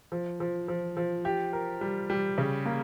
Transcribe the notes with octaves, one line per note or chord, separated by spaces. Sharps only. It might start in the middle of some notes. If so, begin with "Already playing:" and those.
F3
F3
F3
F3
G4
A#4
G3
G3
C#3
A#3